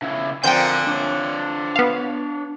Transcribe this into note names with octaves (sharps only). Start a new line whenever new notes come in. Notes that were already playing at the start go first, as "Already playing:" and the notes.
C#3 E4
D3 F3 C4 A#4 G5 G#5 G6
D4 C#5
B3 F5